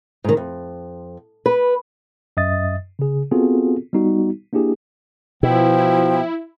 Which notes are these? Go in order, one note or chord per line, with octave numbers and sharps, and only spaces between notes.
G#2 D#3
F2
B4
F#2 D#5 E5 D#6 A6
C#3 G#4
B3 C4 F4 F#4 G#4 A4
G3 B3 D#4 F#4
A#3 D4 E4 G4 G#4
B2 F3 E4 G5